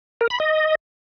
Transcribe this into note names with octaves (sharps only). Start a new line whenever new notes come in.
A#4
B5
D#5